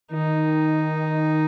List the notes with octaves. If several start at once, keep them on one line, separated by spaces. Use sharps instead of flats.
D#3 D#4